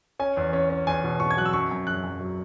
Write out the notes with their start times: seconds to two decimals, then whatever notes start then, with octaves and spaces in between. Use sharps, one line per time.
0.19 C#4 G#5
0.37 E2
0.53 C#4
0.70 C#4
0.87 E2 G#5
1.04 B2
1.20 B2 C#6
1.31 G#6
1.37 F#3 F#6
1.45 E6
1.53 F#2 C#6
1.71 F#2
1.87 F#2 F#6
2.03 F#2
2.21 F#3